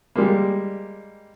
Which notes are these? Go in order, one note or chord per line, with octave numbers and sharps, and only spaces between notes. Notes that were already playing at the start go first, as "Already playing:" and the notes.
G3 G#3 A#3